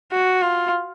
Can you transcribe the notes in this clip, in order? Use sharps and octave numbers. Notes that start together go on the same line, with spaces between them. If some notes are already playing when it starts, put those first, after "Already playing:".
F#4
F4